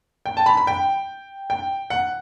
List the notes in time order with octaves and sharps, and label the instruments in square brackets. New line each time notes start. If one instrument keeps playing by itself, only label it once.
[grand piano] G5
A5
B5
B5
G5
G5
F#5